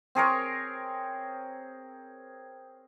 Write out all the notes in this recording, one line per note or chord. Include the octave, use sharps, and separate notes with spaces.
C4 G#4 A#4 C#5